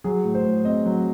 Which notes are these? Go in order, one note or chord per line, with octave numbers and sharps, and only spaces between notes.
F#3 G#4
A2
C5
A2
C4 D#5
F#3